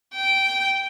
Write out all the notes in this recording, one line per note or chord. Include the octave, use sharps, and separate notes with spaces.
G5